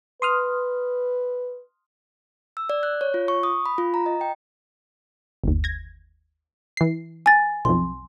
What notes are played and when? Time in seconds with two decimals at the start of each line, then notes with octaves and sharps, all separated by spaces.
0.22 B4 C6 D#6 F6
2.57 E6
2.70 D5
2.83 F#6
3.01 C#5
3.14 F4
3.28 C#6
3.43 D#6
3.66 B5
3.78 F4
3.94 A#5
4.06 D#5
4.21 G5
5.44 G1 D#2
5.64 G#6 A#6
6.77 E3 C7
7.26 G#5 A6
7.65 B1 F2 C6